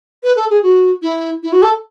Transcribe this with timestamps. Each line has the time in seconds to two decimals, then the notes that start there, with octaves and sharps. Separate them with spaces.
0.23 B4
0.36 A4
0.50 G#4
0.63 F#4
1.02 E4
1.43 E4
1.53 F#4
1.62 A4